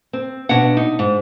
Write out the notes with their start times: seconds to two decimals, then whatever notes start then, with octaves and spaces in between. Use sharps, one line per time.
0.13 C4
0.49 B2 D4 C#5 F#5
0.77 D#4
0.99 G#2